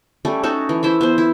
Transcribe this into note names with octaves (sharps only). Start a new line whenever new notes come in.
G3 A3 C#4
C#4 D#4 F#4 A4
E3
E4 C5 E5
B3 C5
E4